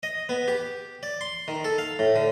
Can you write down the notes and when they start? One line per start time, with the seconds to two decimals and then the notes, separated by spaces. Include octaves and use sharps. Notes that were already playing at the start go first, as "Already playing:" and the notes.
0.03 D#5
0.29 B3
0.48 G4
1.03 D5
1.21 C6
1.48 D#3
1.64 A4
1.78 F5
1.99 A2
2.16 D3